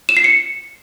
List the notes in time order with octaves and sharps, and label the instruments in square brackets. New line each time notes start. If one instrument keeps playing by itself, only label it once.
[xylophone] E7
C7
C#7